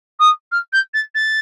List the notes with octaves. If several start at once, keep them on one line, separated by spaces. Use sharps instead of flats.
D#6
F6
G6
A6
A6